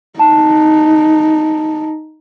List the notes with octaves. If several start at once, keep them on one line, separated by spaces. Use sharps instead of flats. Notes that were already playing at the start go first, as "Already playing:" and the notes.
D#4 A5